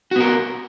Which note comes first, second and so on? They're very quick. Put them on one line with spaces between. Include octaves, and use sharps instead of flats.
F#4 B3 A#4